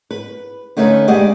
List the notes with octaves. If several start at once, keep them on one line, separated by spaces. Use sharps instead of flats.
B4
D3 A3 C#4 D#4 G4 B4
B2 G#3 G4 D5 D#5 F#5